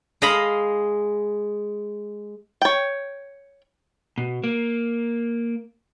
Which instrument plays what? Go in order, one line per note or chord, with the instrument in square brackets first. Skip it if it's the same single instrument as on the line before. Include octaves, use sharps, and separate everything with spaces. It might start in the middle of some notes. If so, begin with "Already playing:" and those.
[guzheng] G#3 D#5 F5 A#5 B5
[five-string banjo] C#5 G5
[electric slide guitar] B2
A#3